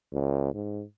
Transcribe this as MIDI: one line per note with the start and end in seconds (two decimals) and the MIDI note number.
0.13 0.53 37
0.54 0.83 44